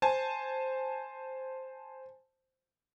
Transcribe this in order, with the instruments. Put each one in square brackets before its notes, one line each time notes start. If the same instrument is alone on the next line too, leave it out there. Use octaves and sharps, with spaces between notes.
[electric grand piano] C5 G#5 A5